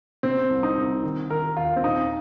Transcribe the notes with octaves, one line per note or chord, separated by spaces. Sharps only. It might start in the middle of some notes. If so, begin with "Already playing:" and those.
C3 C4
C2
D#4
C2
D#3
D#3 A#4
D#2 F4
C4
A#2 D#4